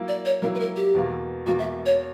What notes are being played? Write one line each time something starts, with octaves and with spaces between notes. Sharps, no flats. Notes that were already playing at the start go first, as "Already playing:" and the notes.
Already playing: F#3 A#3 E4
D5
C#5
F#3 A#3 E4 A#4
B4
A#4
G4
E2 B2 A#3
E2 B2 A#3 F#4
E5
C#5